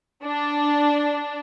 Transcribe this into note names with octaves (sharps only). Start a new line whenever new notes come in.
D4